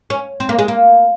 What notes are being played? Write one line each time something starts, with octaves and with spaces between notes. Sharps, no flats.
C#4
C4
A#3
G#3
A#3